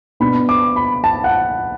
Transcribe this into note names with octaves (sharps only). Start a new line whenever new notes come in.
B2 B3 D4 B5
D6
B5
A5
F#5